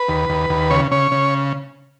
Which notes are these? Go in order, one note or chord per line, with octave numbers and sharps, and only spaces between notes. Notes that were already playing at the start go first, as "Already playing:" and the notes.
Already playing: B4
D#2
D#2
D#2
C#3 C#5
C#3 C#5
C#3